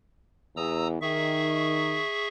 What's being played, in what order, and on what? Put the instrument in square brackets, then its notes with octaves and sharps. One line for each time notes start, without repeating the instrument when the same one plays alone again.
[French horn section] E2 [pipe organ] A#5 D#6 E6
[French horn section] D#3 [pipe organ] G#4 E5 C#6